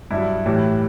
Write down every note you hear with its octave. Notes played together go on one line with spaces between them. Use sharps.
G2 F#3 E4
A2 E3 G3